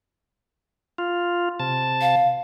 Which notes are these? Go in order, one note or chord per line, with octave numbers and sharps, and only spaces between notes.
F4
C3 A5
F5